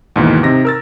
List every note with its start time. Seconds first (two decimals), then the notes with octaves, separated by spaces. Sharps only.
0.16 D#2 G#2 B2 E3
0.43 C3 D#4 A#6
0.65 A#4 E6 A6